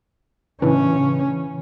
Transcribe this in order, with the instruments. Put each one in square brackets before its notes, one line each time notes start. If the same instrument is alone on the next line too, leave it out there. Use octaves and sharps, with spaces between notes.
[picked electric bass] A2 C#3 D4 [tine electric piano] E3 [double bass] C#4
[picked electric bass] C#3